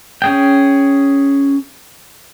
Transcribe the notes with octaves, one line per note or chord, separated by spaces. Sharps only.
C#4 G#4 G5